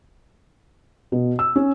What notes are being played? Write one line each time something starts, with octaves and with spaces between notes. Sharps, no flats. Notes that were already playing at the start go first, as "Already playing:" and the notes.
B2
E6
C#4